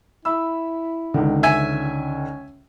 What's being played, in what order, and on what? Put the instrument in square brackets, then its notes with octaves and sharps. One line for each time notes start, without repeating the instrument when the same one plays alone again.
[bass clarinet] E4 [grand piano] E5 B5 E6
[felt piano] C#2 D3 [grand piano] D#3
[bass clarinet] C#4 [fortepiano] E5 G#5